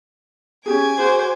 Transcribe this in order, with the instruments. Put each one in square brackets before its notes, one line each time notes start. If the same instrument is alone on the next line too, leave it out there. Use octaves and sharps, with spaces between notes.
[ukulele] C#4 G4 G#4 [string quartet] G#5 D6 G#6
[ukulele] F#4 G#4 [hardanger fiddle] C5